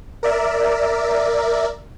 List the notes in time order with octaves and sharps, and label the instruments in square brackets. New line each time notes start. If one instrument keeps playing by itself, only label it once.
[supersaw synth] A#4 D5 E5